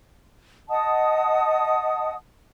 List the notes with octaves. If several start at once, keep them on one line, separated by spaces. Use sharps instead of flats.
D#5 F#5 A5 D#6